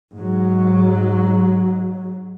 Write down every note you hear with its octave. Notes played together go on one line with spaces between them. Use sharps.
G#2 F#3